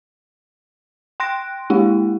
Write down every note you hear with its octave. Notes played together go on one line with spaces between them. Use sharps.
G5 C6 F#6 A#6 D7
G#3 A#3 D4 E4 G4 F#5